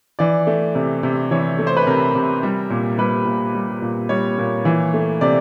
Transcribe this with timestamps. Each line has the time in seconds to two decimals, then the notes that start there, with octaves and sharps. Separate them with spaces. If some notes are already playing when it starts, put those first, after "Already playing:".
0.19 E3 D5
0.47 A3
0.75 C3
1.03 C3
1.31 E3 C#5
1.59 A3
1.67 C5
1.77 B4
1.87 C3 A#4
2.15 C3
2.43 G3
2.70 A#2
2.98 G3 B4
3.26 A#2
3.54 G3
3.82 A#2
4.09 G3 C#5
4.38 A#2
4.65 E3
4.94 A3
5.21 C3 D5